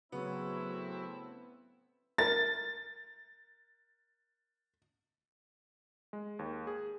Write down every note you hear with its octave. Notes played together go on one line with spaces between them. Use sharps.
A2 C#3 F#3 B3 C4 E4
A#4 A6
G#3
D#2
G#4